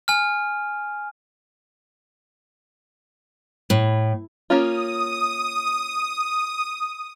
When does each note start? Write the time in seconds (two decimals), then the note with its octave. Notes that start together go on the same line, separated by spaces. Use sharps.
0.08 G#5 F6
3.70 A2
4.50 A#3 C#4 F4 D#6